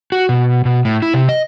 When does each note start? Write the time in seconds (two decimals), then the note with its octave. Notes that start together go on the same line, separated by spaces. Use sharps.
0.12 F#4
0.29 B2
0.65 B2
0.85 A2
1.02 E4
1.14 C3
1.29 D#5